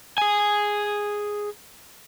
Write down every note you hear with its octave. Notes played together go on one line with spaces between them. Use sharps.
G#4 G#5